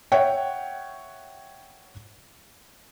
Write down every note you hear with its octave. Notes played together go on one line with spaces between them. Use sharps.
C#5 E5 F#5 G5